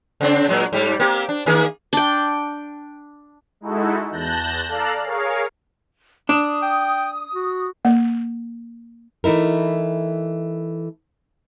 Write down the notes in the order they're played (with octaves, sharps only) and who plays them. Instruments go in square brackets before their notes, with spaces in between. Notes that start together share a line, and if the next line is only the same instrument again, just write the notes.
[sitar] C#3 C4 D4
A#2 F#3 G#3
G#2 G3
A#3 C4 G4
D4
D#3 A#3 G#4
[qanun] D4 G5
[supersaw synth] G#3 D#4 E4 F#4 A4
E2 A5 F#6 G6 A#6
A4 D5 F5 A5 A#5 F#6
G#4 A#4 C#5 F5
[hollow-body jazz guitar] D4 [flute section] D#6
[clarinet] G5
F#4
[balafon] A#3
[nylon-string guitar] E3 A3 D#4 E4 A#4